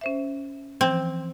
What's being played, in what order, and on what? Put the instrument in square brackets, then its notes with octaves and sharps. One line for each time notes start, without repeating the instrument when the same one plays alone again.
[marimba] C#4 C5 E5
[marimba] E3 F3 [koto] C4